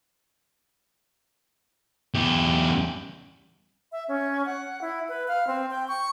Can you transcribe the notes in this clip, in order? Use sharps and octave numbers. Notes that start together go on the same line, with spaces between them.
E2 G4
E5
C#4
F#5
E4
B4
F5
C4
G5
C#6